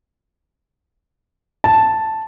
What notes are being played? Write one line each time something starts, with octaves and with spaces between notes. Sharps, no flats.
A5